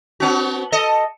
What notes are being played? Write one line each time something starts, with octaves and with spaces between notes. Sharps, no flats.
B3 C4 F#4
A4 D#5